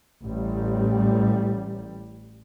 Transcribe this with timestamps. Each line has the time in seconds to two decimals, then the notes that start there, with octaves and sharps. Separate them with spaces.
0.24 A1 G3